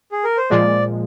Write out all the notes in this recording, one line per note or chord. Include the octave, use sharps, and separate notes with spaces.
G#4
A#4
C5
A#2 F3 G#3 D5